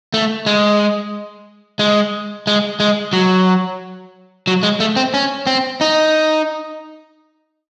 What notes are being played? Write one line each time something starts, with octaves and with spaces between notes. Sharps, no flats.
A3
G#3
G#3
G#3
G#3
F#3
F#3
G#3
A3
C4
C#4
C4
D#4